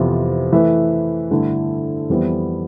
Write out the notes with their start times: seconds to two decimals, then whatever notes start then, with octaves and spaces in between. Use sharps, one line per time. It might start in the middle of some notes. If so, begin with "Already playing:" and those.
Already playing: F2 C3 E3 B3 F4
0.52 E3 A3 E4 B4 E5
1.31 G2 D3 A3 E4
2.10 F2 E3 G3 B3 E4